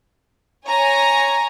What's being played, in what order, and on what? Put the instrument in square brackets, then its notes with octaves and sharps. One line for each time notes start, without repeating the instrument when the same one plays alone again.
[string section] C#5 G#5 A#5